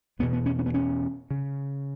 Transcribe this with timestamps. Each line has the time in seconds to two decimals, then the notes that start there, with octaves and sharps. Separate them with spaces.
0.19 E1 E2 B2 B3
0.33 B3
0.46 C#4
0.59 C#4
0.66 B3
0.74 C#4
1.31 C#3